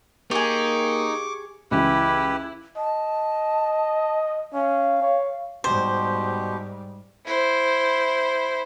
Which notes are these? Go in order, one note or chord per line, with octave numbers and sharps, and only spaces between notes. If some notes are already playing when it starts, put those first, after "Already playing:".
A#3 D#4 G4 G#4 C#6 D6
C#2 E3 E4 G4 B4
D#5 A5
C#4 F5
C#5
G#2 B2 G3 G4 C5
E4 C5